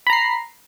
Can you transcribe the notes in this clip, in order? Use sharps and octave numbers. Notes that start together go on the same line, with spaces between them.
A#5 B5 C7